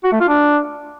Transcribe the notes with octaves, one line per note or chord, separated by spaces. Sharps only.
F#4
A3
F4
D4